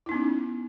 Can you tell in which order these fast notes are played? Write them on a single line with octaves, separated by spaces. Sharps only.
E4 D#4 B3 C#4